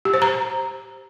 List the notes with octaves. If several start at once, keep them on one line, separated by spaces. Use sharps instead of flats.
G4
C5
A#5